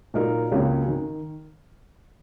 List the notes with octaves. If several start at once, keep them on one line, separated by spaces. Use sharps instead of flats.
A#2 F#3 A#3 D#4 A#4
C#2 C#3 F#3 A#3 C#4
D#3